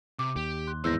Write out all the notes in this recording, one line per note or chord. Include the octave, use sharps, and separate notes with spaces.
C3 D6
D#2 G4
C6 F#6
E2 G#2 C5 E6 G6 A#6